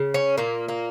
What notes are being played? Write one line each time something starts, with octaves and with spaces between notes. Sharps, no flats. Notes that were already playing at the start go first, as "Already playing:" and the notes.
Already playing: C#3
C#4
A#2 A#3
A#3